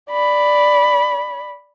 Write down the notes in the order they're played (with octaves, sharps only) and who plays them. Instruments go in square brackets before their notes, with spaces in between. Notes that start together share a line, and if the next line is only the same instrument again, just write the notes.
[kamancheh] D5 B5